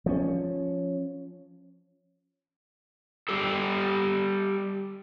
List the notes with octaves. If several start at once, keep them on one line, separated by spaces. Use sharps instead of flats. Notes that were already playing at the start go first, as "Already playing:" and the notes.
F3 C#4
G3 G4 A4